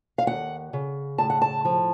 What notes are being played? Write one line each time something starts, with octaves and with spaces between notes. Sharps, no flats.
F5
D#2 F#5
C#3
A2 A5
F#5
A5
F3